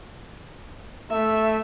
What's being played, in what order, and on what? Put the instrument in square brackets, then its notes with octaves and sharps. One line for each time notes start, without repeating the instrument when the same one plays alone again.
[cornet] A3 [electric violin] E5